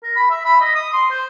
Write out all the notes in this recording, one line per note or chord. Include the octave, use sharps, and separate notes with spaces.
A#4
B5
E5
B5
D#5
D#6
C6
C5